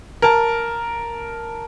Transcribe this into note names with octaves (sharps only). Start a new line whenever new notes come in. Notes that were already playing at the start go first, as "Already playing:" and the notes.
A#4 A5